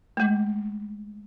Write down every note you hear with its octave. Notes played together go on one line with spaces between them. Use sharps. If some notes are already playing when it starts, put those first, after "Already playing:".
G#3 A3